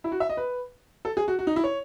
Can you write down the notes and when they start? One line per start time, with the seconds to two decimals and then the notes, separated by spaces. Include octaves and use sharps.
0.04 E4
0.12 F#4
0.20 E5
0.29 D#5
0.37 B4
1.05 A4
1.17 G#4
1.28 F#4
1.39 F#4
1.47 D#4
1.56 E4
1.64 C#5